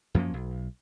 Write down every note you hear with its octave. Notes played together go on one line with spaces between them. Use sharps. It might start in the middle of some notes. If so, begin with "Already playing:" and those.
F#2 F3 A#3 C#4
B1